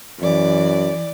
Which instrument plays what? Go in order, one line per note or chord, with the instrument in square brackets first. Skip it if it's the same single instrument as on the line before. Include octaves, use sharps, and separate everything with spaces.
[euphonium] F#2 [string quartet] E3 D5